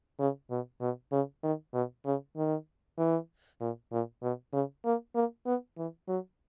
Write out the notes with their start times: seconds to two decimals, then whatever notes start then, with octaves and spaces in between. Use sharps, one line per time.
0.19 C#3
0.50 B2
0.81 B2
1.12 C#3
1.43 D#3
1.73 B2
2.06 C#3
2.36 D#3
2.98 E3
3.61 A#2
3.92 A#2
4.22 B2
4.53 C#3
4.85 A#3
5.15 A#3
5.46 B3
5.77 E3
6.08 F#3